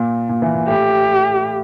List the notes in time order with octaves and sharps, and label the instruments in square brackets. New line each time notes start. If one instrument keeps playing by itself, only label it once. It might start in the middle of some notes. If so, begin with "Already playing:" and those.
Already playing: [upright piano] A#2
A#2
E3
A#2
[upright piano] A2 [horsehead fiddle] G4